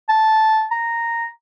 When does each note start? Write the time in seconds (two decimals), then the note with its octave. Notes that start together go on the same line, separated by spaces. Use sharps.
0.09 A5
0.71 A#5